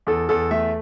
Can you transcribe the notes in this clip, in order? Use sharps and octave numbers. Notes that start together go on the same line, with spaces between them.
E2 A4
E2 A4
A3 E5